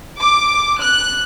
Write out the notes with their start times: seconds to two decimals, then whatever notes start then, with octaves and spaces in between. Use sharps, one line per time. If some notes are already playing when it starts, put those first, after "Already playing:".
0.19 D6
0.80 F#6